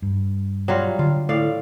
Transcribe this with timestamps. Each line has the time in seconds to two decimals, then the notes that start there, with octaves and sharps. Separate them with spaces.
0.02 G2
0.68 F#3 G3 F4
0.99 D3 F4
1.29 A2 D5 F5